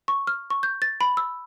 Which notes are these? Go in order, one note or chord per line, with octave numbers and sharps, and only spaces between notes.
C#6
F6
C#6
G6
A6
B5
E6